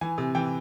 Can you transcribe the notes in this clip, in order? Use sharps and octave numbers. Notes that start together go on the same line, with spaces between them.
E3 G#5
C3
E3 G5